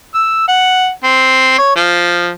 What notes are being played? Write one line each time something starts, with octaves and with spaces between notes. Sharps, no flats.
E6
F#5
C4
C#5
F3